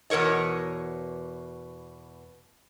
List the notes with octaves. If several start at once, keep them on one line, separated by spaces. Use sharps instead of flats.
E2 B2 A#4 C#5 D#5